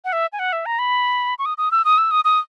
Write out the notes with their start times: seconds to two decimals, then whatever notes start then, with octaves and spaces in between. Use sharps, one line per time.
0.05 F#5
0.13 E5
0.33 G#5
0.39 F#5
0.53 E5
0.66 A#5
0.79 B5
1.39 C#6
1.46 D#6
1.58 D#6
1.71 E6
1.85 D#6
1.98 E6
2.11 D#6
2.25 D#6